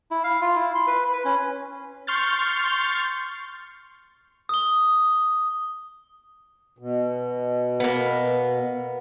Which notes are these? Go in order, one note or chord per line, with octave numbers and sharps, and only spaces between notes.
E4
F5
F4
E4
C6
B4
B4
C#4
C6 C#6 F6 G6 A6
D#6 G7
B2
A#3 B3